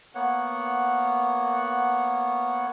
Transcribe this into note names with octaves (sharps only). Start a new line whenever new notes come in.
A#3 B3 C#5 F#5